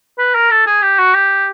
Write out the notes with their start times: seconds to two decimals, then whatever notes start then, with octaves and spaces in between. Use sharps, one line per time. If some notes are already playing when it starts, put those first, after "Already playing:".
0.18 B4
0.35 A#4
0.51 A4
0.67 G#4
0.82 G4
0.99 F#4
1.15 G4